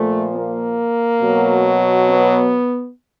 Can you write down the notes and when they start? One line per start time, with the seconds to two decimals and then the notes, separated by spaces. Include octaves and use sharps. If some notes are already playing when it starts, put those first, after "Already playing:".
Already playing: A#2 F3 A3
0.35 A#3
1.22 B2 F#3
2.10 B3